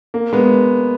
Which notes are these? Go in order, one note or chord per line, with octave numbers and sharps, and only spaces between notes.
A#3
G#3 B3